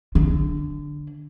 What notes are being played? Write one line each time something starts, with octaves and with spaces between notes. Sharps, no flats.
D3